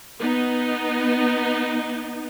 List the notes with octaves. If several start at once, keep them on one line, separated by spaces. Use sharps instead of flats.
B3 D#4